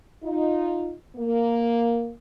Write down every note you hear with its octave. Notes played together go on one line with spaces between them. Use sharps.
D#4 F4
A#3